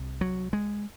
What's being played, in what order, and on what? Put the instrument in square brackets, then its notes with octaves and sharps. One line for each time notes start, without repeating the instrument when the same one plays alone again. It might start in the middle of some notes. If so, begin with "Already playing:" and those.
Already playing: [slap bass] C2 C3
F#3
G#3